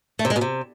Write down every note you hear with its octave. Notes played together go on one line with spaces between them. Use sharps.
A3
C3
G#3
B2
C3